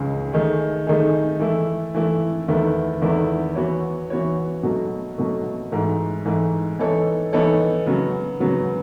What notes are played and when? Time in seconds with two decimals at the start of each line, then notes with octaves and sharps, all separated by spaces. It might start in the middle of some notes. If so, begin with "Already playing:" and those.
Already playing: C#2 C#3 G#3 C#4
0.32 D#3 A3 D#4 G#4
0.87 D#3 A3 D#4 G#4
1.39 E3 A3 E4
1.95 E3 A3 E4
2.48 E2 D#3 A3 E4 B4
3.02 E2 D#3 A3 E4 B4
3.55 E3 B3 F#4 C#5
4.10 E3 B3 F#4 C#5
4.63 B2 F#3 A3
5.18 B2 F#3 A3
5.72 G#2 E3 A3
6.25 G#2 E3 A3
6.79 E3 B3 D#4 A4 C#5
7.33 E3 B3 D#4 A4 C#5
7.86 C#3 F#3 B3
8.40 C#3 F#3 B3